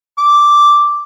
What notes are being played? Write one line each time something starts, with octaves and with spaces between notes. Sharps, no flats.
D6